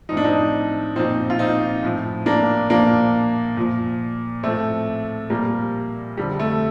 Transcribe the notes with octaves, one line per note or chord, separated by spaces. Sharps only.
A2 F3 D#4
D4
C4 D#4
A#2 F3 C4 D#4
F4
C4 D#4
A2 F3
A#3 D4
A#2 F3 A#3 D4
A#2 F3
A2 F3 A3 C4
A#2 F3 G3 A#3
F2 D3 F3 G3
A3